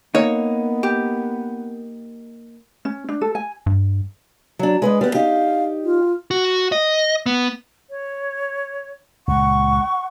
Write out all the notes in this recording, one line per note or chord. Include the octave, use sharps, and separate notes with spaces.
A#3 B3 D#4 C#5
G4
C#4
D4
A4
G#5
G2
F#3 D4
G#3 B4 D#5
G3 B3 B4
D#4 G4 F5
F4
F#4
D#5
B3
C#5
C#2 A#2 F#5 C#6